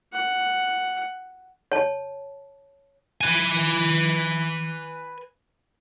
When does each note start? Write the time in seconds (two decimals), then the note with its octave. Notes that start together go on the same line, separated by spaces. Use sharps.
0.12 F#5
1.72 C#5 A5
3.21 B4 G#5